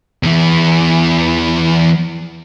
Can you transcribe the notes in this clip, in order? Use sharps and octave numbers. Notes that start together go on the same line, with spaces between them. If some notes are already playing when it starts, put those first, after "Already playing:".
E2 E3